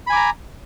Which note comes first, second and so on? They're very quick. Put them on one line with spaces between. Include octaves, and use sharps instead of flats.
B5 G#5 D6 A#5